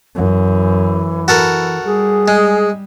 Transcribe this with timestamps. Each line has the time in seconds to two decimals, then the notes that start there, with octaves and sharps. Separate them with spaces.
0.16 F#2 E3
1.28 F#4 A4 A#4
1.84 G3 G#4
2.28 G#3